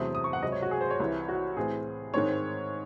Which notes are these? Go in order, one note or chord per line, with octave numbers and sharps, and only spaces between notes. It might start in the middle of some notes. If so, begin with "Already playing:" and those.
Already playing: E2 C3 F#3 A3 C4 D#6
D#6
C#6
F#5
C#2 C3 F#3 C4 D#5
C#5
F#4
G#4
C5
C#5
C2 C3 E3
F#4
A2 E3 C4 G#4
G#2 D#3 G#3 C4 C#5